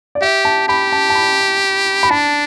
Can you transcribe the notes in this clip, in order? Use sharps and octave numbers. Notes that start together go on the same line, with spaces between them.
D5
G4 E5
A5
G4 B5
A5
A5
B5
B5
D4 A5